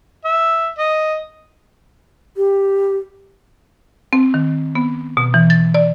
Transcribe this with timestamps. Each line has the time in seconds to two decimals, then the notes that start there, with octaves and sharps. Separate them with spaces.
0.25 E5
0.79 D#5
2.37 G4
4.13 C4
4.34 D#3
4.75 B3
5.17 B2
5.34 E3
5.50 A6
5.74 D5